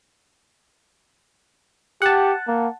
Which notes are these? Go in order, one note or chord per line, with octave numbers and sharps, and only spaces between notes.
G4 F#5 A5
A#3